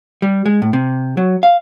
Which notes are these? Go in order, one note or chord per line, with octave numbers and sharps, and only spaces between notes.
G3
G#3
A2
C3
F#3
F5